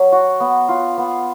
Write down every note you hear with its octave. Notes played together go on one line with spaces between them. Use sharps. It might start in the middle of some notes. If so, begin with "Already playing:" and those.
Already playing: F#3
F#4
B3
F4
B3